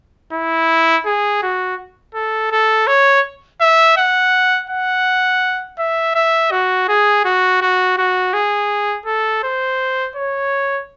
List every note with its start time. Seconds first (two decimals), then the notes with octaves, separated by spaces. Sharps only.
0.33 E4
1.06 G#4
1.43 F#4
2.15 A4
2.51 A4
2.87 C#5
3.61 E5
3.97 F#5
4.70 F#5
5.79 E5
6.15 E5
6.51 F#4
6.88 G#4
7.25 F#4
7.61 F#4
7.98 F#4
8.33 G#4
9.06 A4
9.43 C5
10.16 C#5